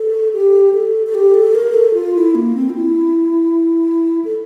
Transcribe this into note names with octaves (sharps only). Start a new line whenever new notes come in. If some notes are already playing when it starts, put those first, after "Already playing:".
Already playing: A4
G4
A4
A4
G4
A4
A#4
A4
F4
E4
A#3
C4
F4
E4
A4